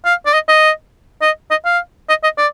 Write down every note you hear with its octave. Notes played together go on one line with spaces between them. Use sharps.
F5
D5
D#5
D#5
D#5
D#5
F5
D#5
D#5
D5